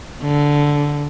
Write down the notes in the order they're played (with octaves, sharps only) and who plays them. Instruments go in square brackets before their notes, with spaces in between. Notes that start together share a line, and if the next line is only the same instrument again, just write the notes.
[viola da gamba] D3